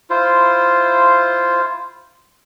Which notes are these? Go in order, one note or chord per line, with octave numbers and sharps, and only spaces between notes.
E4 F4 C5